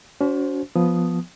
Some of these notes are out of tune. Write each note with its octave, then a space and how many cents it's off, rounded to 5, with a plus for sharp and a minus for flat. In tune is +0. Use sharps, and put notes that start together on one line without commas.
C#4 +45 F#4 +0 C5 +0
F3 +0 B3 -5 D#6 +0